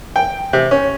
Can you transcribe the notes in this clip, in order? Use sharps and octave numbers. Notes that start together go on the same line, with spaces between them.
G5
C3
C#4